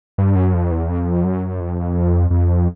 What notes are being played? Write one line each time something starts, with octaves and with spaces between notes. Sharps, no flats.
G2
F#2
F2
E2
F2
F#2
F2
F2